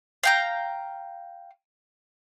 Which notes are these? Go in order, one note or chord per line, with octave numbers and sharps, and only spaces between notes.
F5 G5 A#5